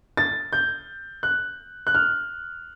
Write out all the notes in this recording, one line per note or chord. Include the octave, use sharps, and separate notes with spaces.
A6
G6
F#6
F#6
F6